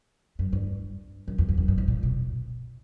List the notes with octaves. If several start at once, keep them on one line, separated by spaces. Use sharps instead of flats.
F#2
G2
F#2
E2
F2
F#2
G2
G#2
A#2
B2